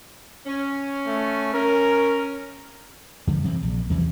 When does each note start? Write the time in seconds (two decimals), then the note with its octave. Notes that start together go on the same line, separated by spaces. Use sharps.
0.46 C#4
1.06 A3
1.53 C#4 A#4
3.27 G2 D3 F3 G3
3.44 C3 E3 A3 C4
3.62 A#1
3.90 E2 C3 E3 F3